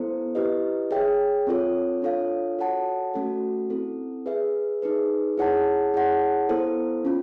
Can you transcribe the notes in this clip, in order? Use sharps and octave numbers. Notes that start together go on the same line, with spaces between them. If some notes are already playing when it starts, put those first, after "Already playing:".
Already playing: B3 E4 A4 C5
E4 G4 B4 D#5
G#4 C#5 E5 G5
C4 F4 A4 C#5
D4 F4 A4 C#5 F5
F#4 A4 C#5 F#5 A5
A3 C#4 F#4 A4
C4 E4 A4
G#4 B4 E5
D#4 G#4 B4
E4 G#4 C#5 F#5 A5
E4 G#4 C#5 F#5 A5
B3 E4 A4 C5
C#4 F4